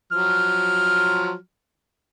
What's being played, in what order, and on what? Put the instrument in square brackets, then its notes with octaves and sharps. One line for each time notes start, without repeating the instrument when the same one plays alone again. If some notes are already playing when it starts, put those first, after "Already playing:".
[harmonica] F3 F#3 F6